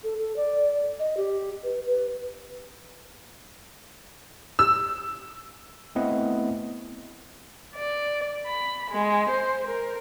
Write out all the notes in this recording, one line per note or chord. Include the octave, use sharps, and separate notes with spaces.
A4
A4
D5
D#5
G4
B4
B4
E6
A3 B3 C4 E4 D#5 F#5
D5
B5
G#3
C5
A#4